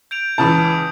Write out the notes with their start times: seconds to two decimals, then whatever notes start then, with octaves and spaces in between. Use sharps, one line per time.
0.11 G6 D7 F7
0.38 C#2 C#3 E3 A5 D#6 G6
0.65 D6